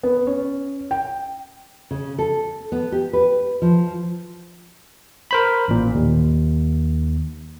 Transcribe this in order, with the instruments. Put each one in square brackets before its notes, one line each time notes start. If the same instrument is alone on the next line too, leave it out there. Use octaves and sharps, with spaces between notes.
[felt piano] B3
C#4
G5
[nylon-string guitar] C#3
A4
B3
G4
B4
F3
[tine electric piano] A#4 C5 B5
A1 A#2
D#2